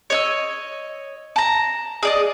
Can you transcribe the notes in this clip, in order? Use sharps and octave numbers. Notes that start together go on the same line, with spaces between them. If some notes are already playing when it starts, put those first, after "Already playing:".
C#5 D#5 E6
A5 A#5
G#4 D5 D#5